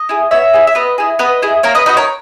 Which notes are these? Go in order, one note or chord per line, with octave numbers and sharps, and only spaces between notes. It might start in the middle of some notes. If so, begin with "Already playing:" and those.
Already playing: D#5
E4 G#4
B3 C#5 E5
E4 G#4
E5
B3 B4 D#5
E4 G#4
B3 B4 D#5
E4 G#4
A#3 A#4 C#5
B4 D#5
D#4 F#4 B4 D#5
A#4 C#5